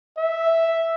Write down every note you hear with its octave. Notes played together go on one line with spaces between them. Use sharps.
E5